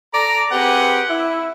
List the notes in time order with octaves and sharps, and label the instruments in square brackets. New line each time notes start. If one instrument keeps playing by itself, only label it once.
[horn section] A4 D5 A#5
C4 G4 G#4 B4 F#5
E4